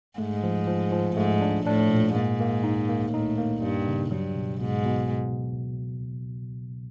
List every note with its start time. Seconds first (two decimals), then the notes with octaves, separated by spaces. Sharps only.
0.18 G#2 A3
0.43 F3
0.67 F3
0.92 F3
1.16 G#2 A3
1.41 D4
1.67 A2 D4
1.90 A#2
2.14 G#2 A#3
2.40 A#3
2.64 D#4
2.89 A#3
3.13 A2 D#4
3.38 A#3
3.62 G2 A#3
3.88 C#3
4.11 G2 F#3
4.36 B2
4.61 G#2 B2
4.85 B2